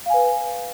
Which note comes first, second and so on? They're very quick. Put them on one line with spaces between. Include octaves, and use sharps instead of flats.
F5 G#5 B4